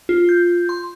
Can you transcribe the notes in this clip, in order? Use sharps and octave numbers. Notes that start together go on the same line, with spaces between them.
F4
G6
C6